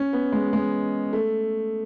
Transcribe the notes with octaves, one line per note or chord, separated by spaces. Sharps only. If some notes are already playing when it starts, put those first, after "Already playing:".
Already playing: C#4
B3
G#3
G#3
A3